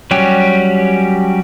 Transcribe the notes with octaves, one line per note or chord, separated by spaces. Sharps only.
F#3 G3 C#4 G4